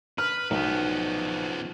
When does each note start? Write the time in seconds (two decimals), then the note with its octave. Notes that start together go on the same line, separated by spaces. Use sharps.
0.18 B4 F6
0.51 B1 F3 B3